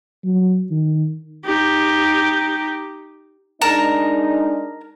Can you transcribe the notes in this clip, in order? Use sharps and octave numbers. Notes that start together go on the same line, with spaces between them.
F#3
D#3
D#4 G4
G#3 D4 D#4 A#4 A5 A#5